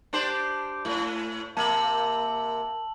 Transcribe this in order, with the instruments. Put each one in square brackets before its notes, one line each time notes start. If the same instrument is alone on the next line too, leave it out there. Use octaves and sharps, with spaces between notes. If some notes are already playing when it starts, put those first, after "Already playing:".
[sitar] D4 G4 C5
A2
[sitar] C3 A#3 [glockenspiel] A5 E6 F#7